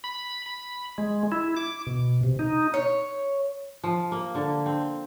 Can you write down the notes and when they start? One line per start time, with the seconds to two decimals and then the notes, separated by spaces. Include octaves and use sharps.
0.04 B5
0.46 B5
0.98 G#3
1.32 E4
1.57 D6
1.87 B2
2.23 C3
2.39 D#4
2.74 C#5
3.84 F3
4.12 A#3
4.35 D3
4.66 C4